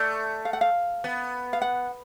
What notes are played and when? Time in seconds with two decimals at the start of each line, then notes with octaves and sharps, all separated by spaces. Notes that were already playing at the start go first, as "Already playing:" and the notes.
Already playing: A3 D5
0.45 F5
0.53 F#5
0.61 F5
1.04 B3
1.53 F5
1.62 F#5